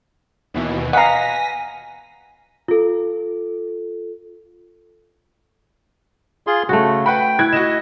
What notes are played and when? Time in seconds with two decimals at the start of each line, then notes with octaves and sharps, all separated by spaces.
0.54 D#2 B2 E3
0.93 B2 F5 F#5 G#5 A#5 A#6 B6
2.68 F4 A4
6.47 F4 G#4 C6
6.69 C#3 A3 F#4
7.06 B4 F#5 G5 B5
7.39 E4 F#6 G#6
7.53 F#4 D#5 E7